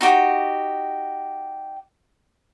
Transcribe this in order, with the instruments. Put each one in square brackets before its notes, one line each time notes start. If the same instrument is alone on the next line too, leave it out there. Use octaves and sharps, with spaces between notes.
[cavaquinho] D#4 F#4 G4